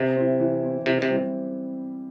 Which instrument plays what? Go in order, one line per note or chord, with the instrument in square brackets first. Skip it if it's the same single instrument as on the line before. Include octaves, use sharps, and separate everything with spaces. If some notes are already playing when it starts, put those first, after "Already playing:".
Already playing: [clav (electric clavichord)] C3
[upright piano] C4 E4
E3
C4 E4
[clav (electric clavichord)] C3 [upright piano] E3
[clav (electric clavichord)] C3
[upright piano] G3 C4 E4